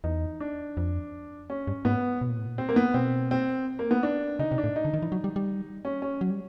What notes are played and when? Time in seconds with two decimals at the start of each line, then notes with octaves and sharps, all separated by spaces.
0.04 E2 D#4
0.41 D4
0.77 F2
1.50 C#4
1.67 G2
1.85 G#2 B3
2.21 B2
2.29 A#2
2.38 A2
2.46 A#2
2.58 C4
2.69 A#3
2.76 B3
2.94 B2 C4
3.31 C4
3.79 A#3
3.91 B3
4.03 D4
4.39 C#3 D#4
4.52 C3
4.58 D4
4.64 A2
4.76 D#4
4.85 D3
4.94 D#3
5.02 E3
5.12 F#3
5.24 G3
5.36 G3
5.85 C#4
6.02 C#4
6.21 F#3
6.30 G3